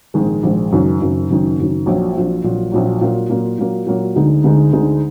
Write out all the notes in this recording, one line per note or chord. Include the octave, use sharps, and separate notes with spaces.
A#1 G#2 D#3 G#3
A#1 G#2 D#3 G#3
F#1 F#2 D#3
F#1 F#2 D#3
F#1 F#2 D#3
F#1 F#2 D#3
A#1 A#2 F#3
A#1 A#2 F#3
A#1 A#2 F#3
A#1 A#2 F#3
A#2 F#3 A#3
A#2 F#3 A#3
A#2 F#3 A#3
A#2 F#3 A#3
D2 D3 G#3 D#4
D2 D3 G#3 D#4
D2 D3 G#3 D#4